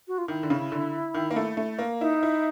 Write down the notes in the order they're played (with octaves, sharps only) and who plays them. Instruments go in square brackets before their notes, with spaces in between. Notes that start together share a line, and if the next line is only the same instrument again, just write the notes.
[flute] F#4
F4
[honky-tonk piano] D#3 [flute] E4
[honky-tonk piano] D3
C#3
D3
D#3
A#3
A3
A3
A#3
[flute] D#4 [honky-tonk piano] E4
[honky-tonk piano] E4